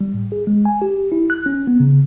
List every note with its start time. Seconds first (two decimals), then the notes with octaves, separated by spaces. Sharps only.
0.01 G3
0.14 A2
0.32 G#4
0.47 G#3
0.65 G#5
0.82 G4
1.12 E4
1.30 F#6
1.46 C#4
1.67 B3
1.80 C#3